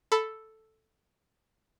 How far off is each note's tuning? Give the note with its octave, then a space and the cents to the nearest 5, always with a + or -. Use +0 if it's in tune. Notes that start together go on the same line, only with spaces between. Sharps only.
A4 +0 B5 +10